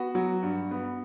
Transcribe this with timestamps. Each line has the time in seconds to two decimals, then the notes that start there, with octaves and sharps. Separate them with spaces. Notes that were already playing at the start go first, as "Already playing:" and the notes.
Already playing: B3 F#4
0.15 F#3
0.43 G2
0.71 B3